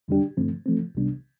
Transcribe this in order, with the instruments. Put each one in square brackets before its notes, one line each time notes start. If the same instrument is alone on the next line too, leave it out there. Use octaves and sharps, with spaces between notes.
[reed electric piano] F2 D3 G3 D4 G4
G2 D3 F3 A3 C4
F3 A3 C4
C2 C3 G3 B3 D4